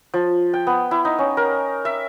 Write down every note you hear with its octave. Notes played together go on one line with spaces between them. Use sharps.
F3
G5
B3
E4
D#4
C#4
A#4
E5